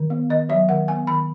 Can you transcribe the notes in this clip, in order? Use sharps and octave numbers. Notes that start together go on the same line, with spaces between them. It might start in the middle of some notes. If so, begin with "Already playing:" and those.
Already playing: D#3
B3
D#3 D#5
F#3 E5
D#3 F#5
B3 G#5
D#3 B5